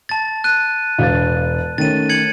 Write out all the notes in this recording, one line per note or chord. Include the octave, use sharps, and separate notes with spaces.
A5 A6
F#6 D#7
E1 F5 A6
D#3 A3 C#4 A6 D#7
G#6 C#7 F#7